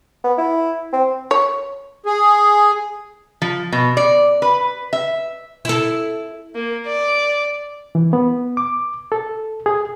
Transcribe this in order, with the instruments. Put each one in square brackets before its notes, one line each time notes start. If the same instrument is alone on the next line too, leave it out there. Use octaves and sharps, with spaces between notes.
[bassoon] B3
E4
C4
[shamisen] C#5
[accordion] G#4
[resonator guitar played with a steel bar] F3
B2
D5
B4
E5
[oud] E4 A4
[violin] A#3
D5
[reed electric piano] E3
B3
D6
A4
G#4